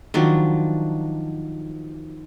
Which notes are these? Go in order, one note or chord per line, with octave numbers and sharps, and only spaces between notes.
D#3 F3 F#3 D4